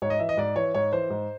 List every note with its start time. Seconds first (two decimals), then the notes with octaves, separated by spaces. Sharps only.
0.02 G#2 C#5
0.10 D#5
0.19 E3 E5
0.29 D#5
0.38 G#2 D5
0.56 E3 C#5
0.74 G#2 C#5
0.93 E3 C5
1.10 G#2